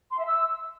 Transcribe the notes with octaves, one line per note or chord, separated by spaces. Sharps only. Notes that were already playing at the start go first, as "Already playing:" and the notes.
C6
E5
E6